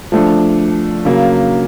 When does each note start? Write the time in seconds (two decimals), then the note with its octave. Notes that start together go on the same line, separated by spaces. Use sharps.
0.12 F3 A3 D4
1.05 C#3 F#3 A#3